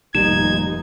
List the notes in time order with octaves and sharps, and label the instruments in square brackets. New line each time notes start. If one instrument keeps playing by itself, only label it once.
[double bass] F1 D#4 [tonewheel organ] A#2 D#3 G3 [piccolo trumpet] G#6 [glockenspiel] E7